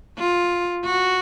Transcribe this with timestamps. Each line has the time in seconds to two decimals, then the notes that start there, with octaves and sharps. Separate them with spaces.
0.19 F4
0.85 F#4